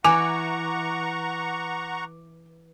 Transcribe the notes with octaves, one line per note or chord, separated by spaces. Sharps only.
E3 F#5 G#5 A#5 C#6 D6